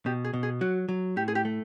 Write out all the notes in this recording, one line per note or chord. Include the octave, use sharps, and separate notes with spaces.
B2 G4
G#4
B2
G#4
F#3 F#4
F#3
A2 G4
G#4
G4
A3